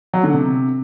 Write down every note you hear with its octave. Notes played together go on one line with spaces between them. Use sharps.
F#3
D3
C3